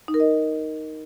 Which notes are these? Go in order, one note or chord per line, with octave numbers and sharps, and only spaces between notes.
D#4
A#4
D#5